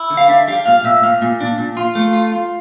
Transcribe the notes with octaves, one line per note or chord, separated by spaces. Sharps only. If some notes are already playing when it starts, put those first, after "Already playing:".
Already playing: E4
D3
F5
D4 E5
G3 F5
A#2 F5
A#2 E5
A#2 F5
A#2
D4
A#2
F4
A3
F4
F4